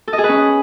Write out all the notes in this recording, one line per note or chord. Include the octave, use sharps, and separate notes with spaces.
A4
D#5
G#4
B4
C#4